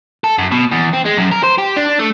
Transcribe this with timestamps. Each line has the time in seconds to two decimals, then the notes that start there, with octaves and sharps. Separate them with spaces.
0.24 A4
0.38 F#2
0.51 B2
0.71 E2
0.93 C4
1.05 G#3
1.17 F#2
1.31 A#4
1.43 C5
1.58 G4
1.77 D4
1.99 A3